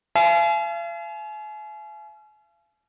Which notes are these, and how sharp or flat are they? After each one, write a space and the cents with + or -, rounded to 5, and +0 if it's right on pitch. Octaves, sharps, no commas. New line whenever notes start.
F5 -45 G#5 +40